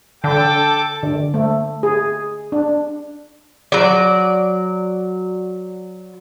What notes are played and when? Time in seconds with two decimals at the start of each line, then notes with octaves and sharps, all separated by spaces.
0.24 D3 A4 G5 A5 D6
1.03 D3
1.34 A3
1.83 G#4
2.52 D4
3.72 F#3 D5